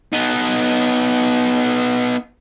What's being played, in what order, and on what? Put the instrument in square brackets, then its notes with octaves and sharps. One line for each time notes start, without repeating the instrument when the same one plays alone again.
[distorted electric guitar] B3 D#4